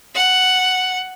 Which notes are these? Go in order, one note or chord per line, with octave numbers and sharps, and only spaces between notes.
F#5